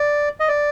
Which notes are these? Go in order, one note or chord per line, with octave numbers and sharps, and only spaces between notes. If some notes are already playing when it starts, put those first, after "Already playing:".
Already playing: D5
D#5
D5